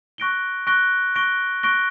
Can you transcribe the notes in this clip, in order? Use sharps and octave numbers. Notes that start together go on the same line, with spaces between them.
C#6 F#6 A#6 D7 G7
C#6 F#6 A#6 D7 G7
C#6 F#6 A#6 D7 G7
C#6 F#6 A#6 D7 G7